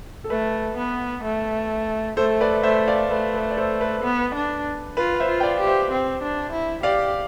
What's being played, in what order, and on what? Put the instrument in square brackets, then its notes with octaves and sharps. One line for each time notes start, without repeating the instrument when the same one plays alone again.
[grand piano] A4
[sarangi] A3 [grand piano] B4
[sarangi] B3
A3
[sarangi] A3 [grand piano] A4 C5
[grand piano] B4 D5
[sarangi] A3 [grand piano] C5 E5
[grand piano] D5 F5
[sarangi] A3 [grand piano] B4
[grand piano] B4
D5
A4 C5
B4
[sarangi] B3
D4
[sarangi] F4 [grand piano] B4
[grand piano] F5
C5 E5
[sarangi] F4
[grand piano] G5
D5 F5
[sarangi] G4
[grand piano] C5 E5
[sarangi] C4
D4
E4
[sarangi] G4 [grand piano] D5 F5